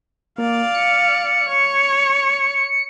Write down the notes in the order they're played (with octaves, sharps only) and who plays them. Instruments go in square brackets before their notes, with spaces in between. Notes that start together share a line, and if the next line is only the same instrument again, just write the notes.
[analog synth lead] A#2 [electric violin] D5 F5
[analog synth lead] C#7
[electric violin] C#5